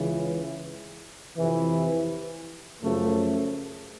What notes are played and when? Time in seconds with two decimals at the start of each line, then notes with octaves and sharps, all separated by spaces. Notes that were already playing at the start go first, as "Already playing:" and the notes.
Already playing: C#2 C#3 E3
1.37 F2 C3 E3
2.82 F#2 C#3 F3 A3